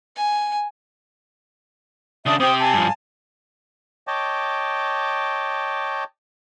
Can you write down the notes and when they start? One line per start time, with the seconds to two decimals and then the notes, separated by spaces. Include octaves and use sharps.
0.16 G#5
2.26 C#3 D4 E5 A5 D#6
2.40 C3 G4 C5 G5 D#6
2.59 G#5 A5
2.74 G2 F3
4.07 C#5 D#5 G5 A5 D6